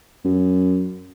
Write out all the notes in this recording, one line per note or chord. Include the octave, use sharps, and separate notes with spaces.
F#2